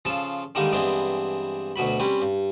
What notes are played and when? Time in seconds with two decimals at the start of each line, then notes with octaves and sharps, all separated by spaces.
0.05 C#3 F3 F4 A4
0.55 D3 D#3 G3 G#3 A#3 D#4
0.72 G2 E3 G#3 B3 C4 D4
1.76 D2 B2 F#3 B5
1.99 G3 C4 C#4 B4
2.22 G2